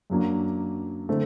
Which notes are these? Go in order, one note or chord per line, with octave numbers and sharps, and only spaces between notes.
F#2 F#3 A#3 D4
D3 A3 C4